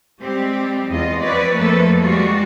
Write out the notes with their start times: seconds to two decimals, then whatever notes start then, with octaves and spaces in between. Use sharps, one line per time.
0.21 G3 G#3 C4 G4
0.89 E2 F4 D#5
1.20 F3 C4 B4 C#5 D5
1.55 F2 F3 A3 A#3 A4 B4
2.01 G3 G#3 F4 F#4